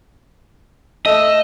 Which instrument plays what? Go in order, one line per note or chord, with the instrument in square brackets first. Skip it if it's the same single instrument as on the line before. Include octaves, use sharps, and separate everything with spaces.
[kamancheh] A3 E6 [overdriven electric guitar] D#5